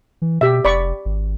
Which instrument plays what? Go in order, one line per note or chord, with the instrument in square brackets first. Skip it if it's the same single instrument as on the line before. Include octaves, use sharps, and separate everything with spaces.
[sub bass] E3
[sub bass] B2 [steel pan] G4 E5
[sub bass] F1 [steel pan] D5 B5 C#6
[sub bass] G#1